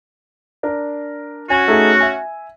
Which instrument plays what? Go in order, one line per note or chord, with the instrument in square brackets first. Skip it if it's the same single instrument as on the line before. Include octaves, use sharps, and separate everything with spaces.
[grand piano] D4 A#4
[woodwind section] C#4 F#4 [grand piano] G#5
[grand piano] A3 D#4 G#4
E5 G#5